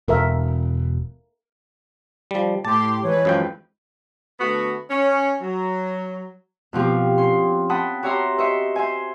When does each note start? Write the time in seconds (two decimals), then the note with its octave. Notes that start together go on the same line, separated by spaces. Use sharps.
0.08 E1 A4 A#4 E5
2.31 F3 G3
2.65 A2 G4 A5 C6 D6
3.03 E3 G#3 B4 C#5
3.25 F#2 F3 G5
4.40 D3 A3 B3 F#4
4.89 C#4
5.41 F#3
6.73 F2 B2 F3 G4
7.18 C#4 C6
7.70 F#5 G5 A5 B5 D#6
8.03 F#4 G4 C#5 E5 A#5 C6
8.38 C5 D#5 E5 C#6
8.76 C5 E5 G#5